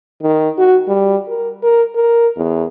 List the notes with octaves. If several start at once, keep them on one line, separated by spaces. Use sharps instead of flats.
D#3
F#4
G3
A#4
A#4
A#4
E2